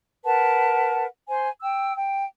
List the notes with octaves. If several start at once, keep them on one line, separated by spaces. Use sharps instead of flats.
A#4 B4 F#5 A5
C5 G#5
G5 E6
G5